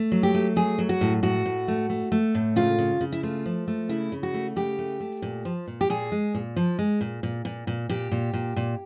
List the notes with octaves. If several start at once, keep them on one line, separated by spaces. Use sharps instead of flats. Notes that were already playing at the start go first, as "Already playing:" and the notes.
Already playing: A3
F#3
G4
A3
F#3 G#4
F#3
F#4
A2
A2 F#4
A2
A3
A3
A3
A2
C#3 F4
C#3
C#3
E4
A3 F4
F3
A3
C#3 E4
C#3
F#4
A3
C#3 G4
A3
A3
A#2
F3
A#2
G4
A#2 G#4
G#3
A#2
F3
G#3
A#2
A#2
A#2
A#2
A#2 G4
A#2
A#2
A#2